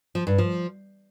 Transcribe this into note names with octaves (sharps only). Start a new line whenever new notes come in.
F3
G2
F3